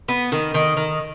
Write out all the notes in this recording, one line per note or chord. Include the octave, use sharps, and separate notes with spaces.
B3
D#3
D#3
D#3